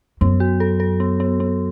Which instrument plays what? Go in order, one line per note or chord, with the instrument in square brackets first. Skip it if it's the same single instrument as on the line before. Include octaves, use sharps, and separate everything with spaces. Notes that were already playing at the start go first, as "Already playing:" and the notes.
[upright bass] F#2 [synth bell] B3
[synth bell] F#4
A4
A4
B3
B3
B3